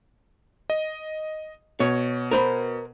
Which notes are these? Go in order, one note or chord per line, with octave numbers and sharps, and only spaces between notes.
D#5
B2 C#5
A#4 C5 B5